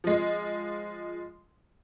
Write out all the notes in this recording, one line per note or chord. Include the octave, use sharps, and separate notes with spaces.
F3 G#3